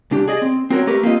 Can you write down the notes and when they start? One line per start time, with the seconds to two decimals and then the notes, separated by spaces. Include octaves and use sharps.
0.11 C2 D4 G4
0.28 G#4 D5 D#5
0.42 C4
0.70 C4 F#4 A#4 C#5 G5
0.87 A3 G4 A#4 B4
1.03 A#3 C4 F4 D#5